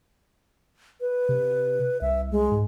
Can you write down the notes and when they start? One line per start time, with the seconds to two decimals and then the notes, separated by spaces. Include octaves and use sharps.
1.01 B4
1.29 C3
2.01 C2 E5
2.31 G#3
2.52 G#2